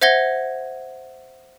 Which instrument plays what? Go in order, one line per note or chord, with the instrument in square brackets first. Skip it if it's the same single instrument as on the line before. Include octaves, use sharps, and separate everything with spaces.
[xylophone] C5 E5 F#5 G#6 A#6 G7